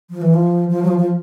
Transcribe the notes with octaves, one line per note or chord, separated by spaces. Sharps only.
F3
E3
F3
F3
F#3
F3
F3